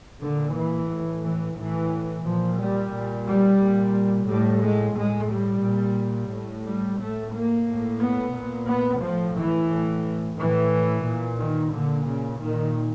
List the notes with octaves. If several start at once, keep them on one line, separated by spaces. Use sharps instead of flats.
A#2 D3
E3
A2
E3
A2 E3
A#2 F3
G3
A#2
G3
A#2
A2 G3
G#3
A2 G#3
G3
A#2
A2
G3
A2 A3
A#3
A2
B3
A#2
B3
A2 F3
E3
A2
A2 E3
A#2
D#3
A#2 D3
C#3
A#2 D#3